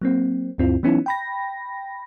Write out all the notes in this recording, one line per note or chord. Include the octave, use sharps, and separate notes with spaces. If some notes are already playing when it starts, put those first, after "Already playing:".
F#3 A#3 C4
D2 G2 C4 E4 F4
E3 F#3 B3 C#4 D#4 E4
G5 B5 A#6